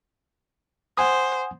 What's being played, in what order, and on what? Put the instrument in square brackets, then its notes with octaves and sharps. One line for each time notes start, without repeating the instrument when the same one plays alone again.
[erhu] C5 [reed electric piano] F#5 G#5 D#6